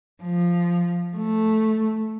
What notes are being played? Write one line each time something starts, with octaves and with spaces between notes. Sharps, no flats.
F3
A3